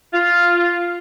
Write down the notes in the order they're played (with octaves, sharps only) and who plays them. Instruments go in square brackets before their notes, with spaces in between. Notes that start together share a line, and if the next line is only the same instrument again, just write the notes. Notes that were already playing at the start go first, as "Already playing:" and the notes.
[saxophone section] F4